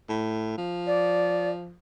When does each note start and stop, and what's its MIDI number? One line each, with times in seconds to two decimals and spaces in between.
0.09 0.55 45
0.58 1.74 53
0.86 1.49 74